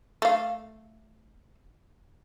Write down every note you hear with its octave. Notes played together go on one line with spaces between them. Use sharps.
A3 F5